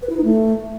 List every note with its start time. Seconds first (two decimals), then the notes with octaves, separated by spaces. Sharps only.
0.02 B4
0.10 E4
0.17 D#4
0.24 A3